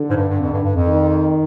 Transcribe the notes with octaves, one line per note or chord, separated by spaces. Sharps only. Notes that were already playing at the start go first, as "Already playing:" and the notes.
Already playing: D3
G#2
G2
G2
F2
G2
G2
F2
D#3